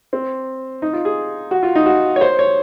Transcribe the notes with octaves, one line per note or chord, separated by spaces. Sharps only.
C4
D#4
F4
G#4
F#4
F4
D#4
F#4
C#5
C5
C#5